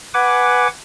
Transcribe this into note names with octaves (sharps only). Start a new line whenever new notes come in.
B4 F#5 G#5 D6